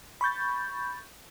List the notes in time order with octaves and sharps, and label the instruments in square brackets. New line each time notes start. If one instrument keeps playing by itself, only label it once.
[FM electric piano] B5 C#6 G6 A6